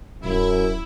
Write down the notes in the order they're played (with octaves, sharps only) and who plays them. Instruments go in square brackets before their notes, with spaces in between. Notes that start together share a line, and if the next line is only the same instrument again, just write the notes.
[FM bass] D1 [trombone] F#2 [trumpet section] E4